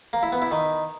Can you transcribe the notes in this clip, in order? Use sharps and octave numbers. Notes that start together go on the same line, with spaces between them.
A#3
E4
B3
E4
D#3